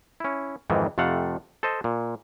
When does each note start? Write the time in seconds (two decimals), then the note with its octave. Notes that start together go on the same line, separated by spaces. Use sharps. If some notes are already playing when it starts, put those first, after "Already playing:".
0.20 C#4 E4
0.70 F2 G#2 D#3 E3
0.98 F2 C3 A3 A4 F5 F#5
1.63 A4 C5 D#5
1.84 A#2